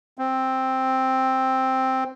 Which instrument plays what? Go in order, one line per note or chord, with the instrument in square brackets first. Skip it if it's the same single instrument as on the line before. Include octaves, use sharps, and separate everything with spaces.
[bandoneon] C4